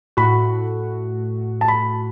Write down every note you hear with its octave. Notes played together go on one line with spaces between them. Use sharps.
A2 A3 F#4 B5
A5
B5